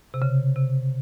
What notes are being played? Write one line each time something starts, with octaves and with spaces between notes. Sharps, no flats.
C3
C#3
C3